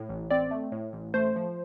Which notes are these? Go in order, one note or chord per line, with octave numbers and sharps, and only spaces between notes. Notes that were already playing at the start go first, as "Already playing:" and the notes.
Already playing: A2
A1
C4 D5
A3
A2
A1
A3 C5
F3